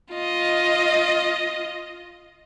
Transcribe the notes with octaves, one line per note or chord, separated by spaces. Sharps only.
F4 D#5